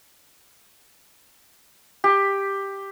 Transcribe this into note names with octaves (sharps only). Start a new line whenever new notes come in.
G4